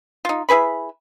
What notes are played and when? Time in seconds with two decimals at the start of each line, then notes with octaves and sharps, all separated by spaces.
0.25 D#4 F4
0.49 E4 G#4 B4 B5